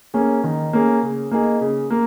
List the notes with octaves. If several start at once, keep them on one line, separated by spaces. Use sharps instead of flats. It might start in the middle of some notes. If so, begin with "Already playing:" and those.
A#3 C#4 G#4
D#3
A#3 C#4 G#4
C#3
A#3 D#4 G#4
C#3
A#3